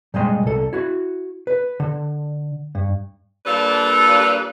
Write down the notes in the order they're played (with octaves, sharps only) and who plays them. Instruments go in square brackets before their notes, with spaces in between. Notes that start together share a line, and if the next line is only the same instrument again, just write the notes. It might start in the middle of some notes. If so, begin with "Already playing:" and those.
[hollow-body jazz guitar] A#2 G3 G#3 D#5 C6
C2 A4
E4 F#4
B4
D3
G2
[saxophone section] A#2 G3 D4 A4 B4 F5